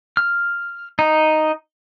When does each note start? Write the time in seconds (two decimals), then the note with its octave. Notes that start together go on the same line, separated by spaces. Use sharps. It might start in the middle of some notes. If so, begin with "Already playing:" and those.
0.17 F6
0.99 D#4